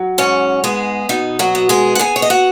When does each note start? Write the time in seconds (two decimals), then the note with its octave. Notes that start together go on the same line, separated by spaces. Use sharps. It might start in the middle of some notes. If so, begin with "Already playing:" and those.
Already playing: F#3
0.18 G#2 C#4 C#5
0.64 G#3 B3 G#4
1.09 B2 D#4
1.39 F#3 F#4
1.55 B3
1.69 G#3 G#4
1.95 F#5
1.99 B3 G#4 G#5
2.16 C#5
2.22 D#5
2.30 F#4 F#5